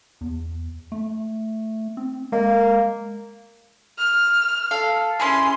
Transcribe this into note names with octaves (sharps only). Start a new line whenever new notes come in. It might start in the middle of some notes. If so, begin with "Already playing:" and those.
E2
A3
C4
G#3 A#3
F6
A4 F5
C#4 E4 G#4 C6